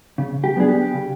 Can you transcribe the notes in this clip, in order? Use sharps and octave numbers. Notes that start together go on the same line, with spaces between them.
C#3
G4
F#3 B3 D4 G#4
G4
C#3